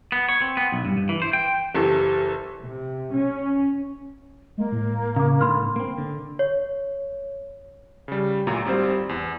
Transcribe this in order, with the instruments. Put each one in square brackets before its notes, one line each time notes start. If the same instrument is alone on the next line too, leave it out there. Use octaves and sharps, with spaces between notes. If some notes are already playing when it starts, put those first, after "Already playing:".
[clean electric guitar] B3
C#5
C4
B3
B1
G2
G2
E3
C5
G5
[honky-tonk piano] F#1 E3 A4 [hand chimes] G4 A#4
[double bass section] C3
C#4
[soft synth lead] G#3 [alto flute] A#3
[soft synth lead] A2
[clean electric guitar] C#3 [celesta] F5 D6
[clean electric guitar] G#2 D3 [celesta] B5 C6 F6
[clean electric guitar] A#3 C4
D3
[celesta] C#5
[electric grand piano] C#3 G3
D2 A#2 F#3 A#5
G#1 G3 C4 C5
E2